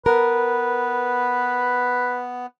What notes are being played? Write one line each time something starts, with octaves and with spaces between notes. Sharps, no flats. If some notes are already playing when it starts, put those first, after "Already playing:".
B3 A#4 B4